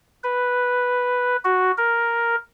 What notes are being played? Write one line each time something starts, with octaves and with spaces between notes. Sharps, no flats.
B4
F#4
A#4